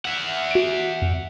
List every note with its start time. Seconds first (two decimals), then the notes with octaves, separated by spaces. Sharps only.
0.05 E5 F#5
0.51 F#4 D7
1.02 F2